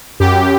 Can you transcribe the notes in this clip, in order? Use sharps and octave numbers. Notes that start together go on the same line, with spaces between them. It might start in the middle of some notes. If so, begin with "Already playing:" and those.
F#2 G4